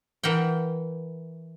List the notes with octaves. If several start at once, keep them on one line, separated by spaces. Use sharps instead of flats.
E3 A#4 F#5 G5